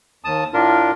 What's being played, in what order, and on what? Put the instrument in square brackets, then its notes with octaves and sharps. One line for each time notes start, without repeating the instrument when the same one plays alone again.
[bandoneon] D#2 A5 D#6
A2 D4 F4 A#4